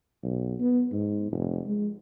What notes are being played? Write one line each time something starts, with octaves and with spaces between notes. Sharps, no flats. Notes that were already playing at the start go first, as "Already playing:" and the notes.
B1
B3
G#2
F1
G#3